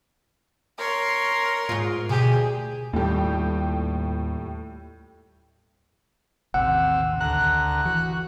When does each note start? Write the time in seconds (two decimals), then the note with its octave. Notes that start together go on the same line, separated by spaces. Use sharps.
0.78 A#4 C#5 C6
1.69 G#2 F4
2.09 D2 B2 G4 G#4
2.93 D#2 A2 G3 G4
6.54 A1 D#2 C3 F#5 E6
7.20 D2 A#5 F#6
7.85 E3 F#4